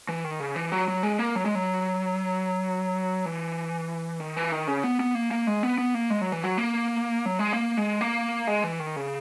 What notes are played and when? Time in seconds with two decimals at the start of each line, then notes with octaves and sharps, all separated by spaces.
0.09 E3
0.24 D#3
0.40 C#3
0.56 E3
0.72 F#3
0.88 F#3
1.03 G#3
1.19 A#3
1.36 F#3
1.45 G#3
1.55 F#3
3.25 E3
4.20 D#3
4.36 E3
4.52 D#3
4.68 C#3
4.84 B3
5.00 B3
5.15 A#3
5.31 A#3
5.47 G#3
5.63 B3
5.78 B3
5.95 A#3
6.10 G#3
6.21 F#3
6.32 E3
6.43 F#3
6.58 A#3
7.26 F#3
7.39 G#3
7.53 A#3
7.77 G#3
8.01 A#3
8.47 G#3
8.64 E3
8.80 D#3
8.96 C#3